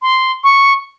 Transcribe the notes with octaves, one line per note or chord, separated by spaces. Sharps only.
C6
C#6